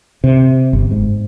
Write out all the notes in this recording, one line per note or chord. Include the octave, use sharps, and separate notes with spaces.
C3
G1
G#2